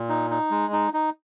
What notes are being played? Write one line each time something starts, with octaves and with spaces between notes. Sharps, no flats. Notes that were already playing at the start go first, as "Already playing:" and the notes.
Already playing: A#2
D#4
D#4
G#3
D#4
D#4